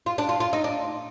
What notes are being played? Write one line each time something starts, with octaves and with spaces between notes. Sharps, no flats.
F4
D4
F4
F4
D#4
D4